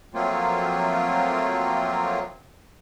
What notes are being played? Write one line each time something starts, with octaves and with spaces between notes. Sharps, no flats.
F3 F#3 A3 A#3 C4 F4